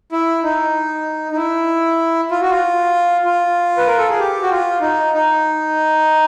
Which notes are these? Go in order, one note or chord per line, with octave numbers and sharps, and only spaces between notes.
E4
D#4
D#4
E4
F4
F#4
F4
F4
B4
A#4
A4
G#4
G4
F#4
F4
D#4
D#4